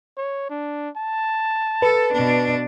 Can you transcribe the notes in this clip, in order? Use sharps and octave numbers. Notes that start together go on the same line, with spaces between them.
C#5
D4
A5
A4 B4
B2 D4